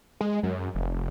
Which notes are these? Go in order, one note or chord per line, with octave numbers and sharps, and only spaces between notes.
G#3
F#2
F1